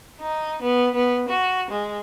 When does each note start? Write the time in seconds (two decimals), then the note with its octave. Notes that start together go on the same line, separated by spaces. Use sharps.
0.19 D#4
0.62 B3
0.95 B3
1.28 F#4
1.70 G#3